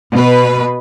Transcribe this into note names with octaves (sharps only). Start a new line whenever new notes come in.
B2 B4